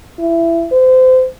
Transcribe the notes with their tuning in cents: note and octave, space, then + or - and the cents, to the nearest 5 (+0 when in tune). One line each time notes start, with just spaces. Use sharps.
E4 +20
C5 -30